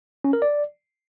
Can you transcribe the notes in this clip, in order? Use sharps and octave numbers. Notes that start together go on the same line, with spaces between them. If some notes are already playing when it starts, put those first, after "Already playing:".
C#4
A#4
D5